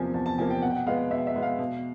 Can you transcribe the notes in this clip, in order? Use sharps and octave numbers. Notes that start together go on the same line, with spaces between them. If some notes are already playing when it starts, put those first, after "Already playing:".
Already playing: E2 C3 F3 A#3 G#5
E2 A5
A5
C3 F3 A#3 G#5
G5
B2 F#5
G5
F#5
G#3 B3 F5
B2 E5
E5
G#3 B3
F5
B2